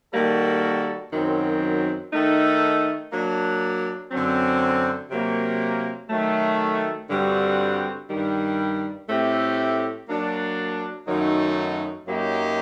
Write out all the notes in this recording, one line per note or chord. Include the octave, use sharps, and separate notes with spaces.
D#3 G3 A#3 F#4 A4
F#2 D#3 F#3 C4
D#3 A3 D#4 A4
F#3 A#3 D4
F#2 D3 F#3 C4
C3 F#3 A#3
D#3 F#3 A3
G2 D3 G3 C4 F#4
G2 D#3 G3
A2 A3 C4 G4
F#3 A#3 D4
F#2 D#3 F#3 A3 D#4
F#2 F#3 A#3 D#4 G4